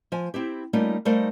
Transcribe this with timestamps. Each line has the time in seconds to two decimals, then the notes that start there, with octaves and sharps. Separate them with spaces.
0.12 F3 G#5
0.34 C4 E4 G4
0.73 G3 A3 A#3 C#4 D#4 F4
1.05 G3 A3 D#4 A#4 C5 F5